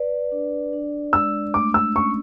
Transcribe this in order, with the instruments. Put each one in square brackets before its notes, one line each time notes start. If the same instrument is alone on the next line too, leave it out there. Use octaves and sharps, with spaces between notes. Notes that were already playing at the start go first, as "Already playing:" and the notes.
Already playing: [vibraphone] B4 D5
D4
D4
[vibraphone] G#3 [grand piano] E6
[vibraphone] A3 [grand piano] D6
[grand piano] E6
[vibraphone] C#4 [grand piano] C#6